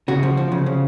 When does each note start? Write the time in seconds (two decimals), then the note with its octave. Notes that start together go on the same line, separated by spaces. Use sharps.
0.08 C#3 F#4
0.23 F3
0.37 F3
0.52 C#3
0.66 C#3